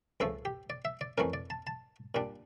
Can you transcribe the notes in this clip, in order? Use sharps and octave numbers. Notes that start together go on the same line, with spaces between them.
C#2 C#3 F3 A3 A4
G4
D5
E5
D5
F2 E3 A3 C#4 A#4
D5
A5
A5
A#2 G3 D4